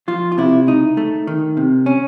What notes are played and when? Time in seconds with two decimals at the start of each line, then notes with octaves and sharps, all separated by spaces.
0.08 F3 F4
0.32 F4
0.38 C3 E4
0.67 C#2 D#4
0.97 A3
1.27 D#3
1.57 C3
1.86 C#4